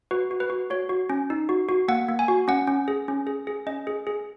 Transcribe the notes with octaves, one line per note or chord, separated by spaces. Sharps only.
F#4 B4
F#4
B4
F#4
F#4 C#5
F#4
C#4
D#4
F#4
F#4
A#3 F#5
A#3
G#5
F#4
C#4 F#5
C#4
G#4
C#4
G#4
G#4
C#4 D#5
G#4
G#4